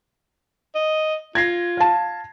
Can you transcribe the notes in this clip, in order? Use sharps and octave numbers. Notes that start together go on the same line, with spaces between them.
D#5
F4 G#6 A#6 C7
F5 A5